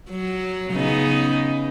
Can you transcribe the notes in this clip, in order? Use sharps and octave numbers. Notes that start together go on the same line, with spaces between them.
F#3
C#3 B3 D#4